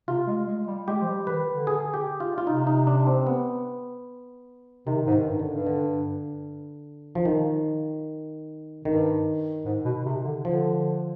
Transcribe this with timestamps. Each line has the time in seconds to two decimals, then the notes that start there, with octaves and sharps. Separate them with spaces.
0.08 C3 F4
0.27 G#3
0.47 G#3
0.67 G3
0.87 G#3 G4
1.01 F3
1.08 G3
1.27 D#3 B4
1.47 D3
1.67 G#4
1.94 G4
2.20 F4
2.38 F4
2.47 C3 D#4
2.67 D#4
2.87 D4
3.07 C4
3.27 B3
4.87 C3 D#3
5.07 G#2
5.12 D#3
5.26 G2
5.39 D3
5.47 G2
5.66 D3
7.15 F3
7.25 D#3
8.85 G2 D#3
9.65 G#2
9.85 B2
10.06 C3
10.24 D3
10.45 D3 F3